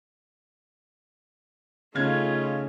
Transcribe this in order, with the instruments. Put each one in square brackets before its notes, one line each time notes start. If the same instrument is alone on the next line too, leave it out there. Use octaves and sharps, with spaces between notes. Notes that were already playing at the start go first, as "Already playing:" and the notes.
[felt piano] C#3 F5 G#6 [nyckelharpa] A3 F4 [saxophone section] C#4 D#4